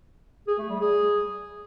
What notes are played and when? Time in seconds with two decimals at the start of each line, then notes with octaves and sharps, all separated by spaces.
0.47 G#4
0.58 A3
0.69 G3
0.80 G#4